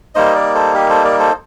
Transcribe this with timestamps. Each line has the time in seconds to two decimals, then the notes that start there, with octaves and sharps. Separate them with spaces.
0.15 G3 A#3 D#4 C5 D#5
0.35 A#4 D5
0.55 A4 C5
0.74 G4 A#4
0.89 A4 C5
1.04 A#4 D5
1.19 A4 C5